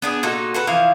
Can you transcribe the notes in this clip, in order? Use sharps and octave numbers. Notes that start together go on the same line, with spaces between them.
B3 D4 G#4
A#2 D#4 F#4 A4
F#4 A4 B4
E3 F3 E4 F5